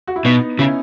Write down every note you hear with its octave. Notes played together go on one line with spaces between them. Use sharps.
F#4
E4
B2 B3 D#4
C#3 C#4 E4